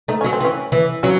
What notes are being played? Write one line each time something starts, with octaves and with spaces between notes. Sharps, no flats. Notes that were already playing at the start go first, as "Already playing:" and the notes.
A3 D#4
F#3 C#4
C4
E3 C#4
E3
F#3 C#4 E4